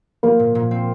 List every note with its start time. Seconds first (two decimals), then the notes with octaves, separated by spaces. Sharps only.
0.23 F3 A#3
0.39 A#2
0.55 A#2
0.71 C4